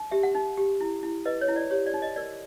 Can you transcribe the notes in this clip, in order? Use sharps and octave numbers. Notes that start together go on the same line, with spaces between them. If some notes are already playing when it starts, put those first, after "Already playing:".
Already playing: D#4
G4 E5
F#5
D#4
G4
E4
E4
B4 D#5
C#5
E4
D5
G4 C#5
D5
D#4
D#5
A#4 D5